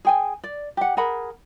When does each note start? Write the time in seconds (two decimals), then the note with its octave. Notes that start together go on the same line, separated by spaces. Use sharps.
0.05 G#4 G5 G#5
0.44 D5
0.77 G4 F#5
0.97 G#4 A#4 F#5 B5